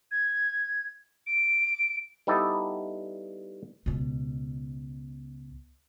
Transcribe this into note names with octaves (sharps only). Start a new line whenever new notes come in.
G#6
D7
G3 B3 D#4 E4 A4 D5
C#2 B2